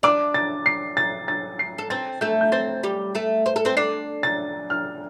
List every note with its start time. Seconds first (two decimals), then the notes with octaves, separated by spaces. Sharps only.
0.03 D4 D5 D6
0.34 A6
0.66 C7
0.97 A6
1.28 A6
1.59 C7
1.78 A4
1.90 C4 C5 A6
2.21 A3 A4 G6
2.41 G6
2.52 C4 C5 A6
2.83 G3 G4
3.15 A3 A4
3.46 C5
3.56 A4
3.65 C4 C5
3.77 D4 D5 C7
4.23 A6
4.70 F6